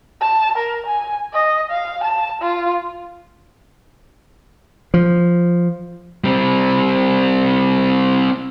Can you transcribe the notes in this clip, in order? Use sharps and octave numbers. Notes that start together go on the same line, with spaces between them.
A5
A#4
G#5
D#5
F5
A5
F4
F3
G3 C4